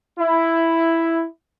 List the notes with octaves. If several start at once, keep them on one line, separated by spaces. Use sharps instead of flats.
E4